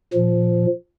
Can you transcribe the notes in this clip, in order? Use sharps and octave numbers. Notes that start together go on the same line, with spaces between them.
A#2 F3